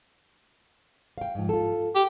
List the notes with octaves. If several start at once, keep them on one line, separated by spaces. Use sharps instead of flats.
F5 G5
G#2 F3
F4 A4
G4